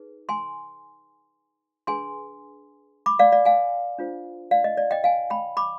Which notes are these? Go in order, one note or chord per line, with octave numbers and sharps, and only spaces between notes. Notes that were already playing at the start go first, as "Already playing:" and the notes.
Already playing: D#4 G#4 B4
G#5 C6
D4 G#4 B4 G#5 C6
B5 D6
D5 F5
D5 F5
F5 G#5
D4 F4 C5
D5 F5
D#5
D5
D#5 G5
F5 G#5
G5 B5
B5 D6